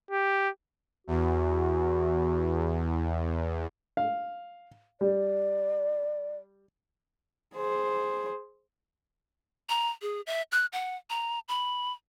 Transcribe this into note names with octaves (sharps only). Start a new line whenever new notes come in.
G4
E2 F#4
F5
G3 D5
G#4 C5
A#5
G#4
E5
F#6
F#5
A#5
B5